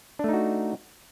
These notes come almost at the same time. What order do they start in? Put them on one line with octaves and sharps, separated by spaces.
D4 A3 D#4 F#4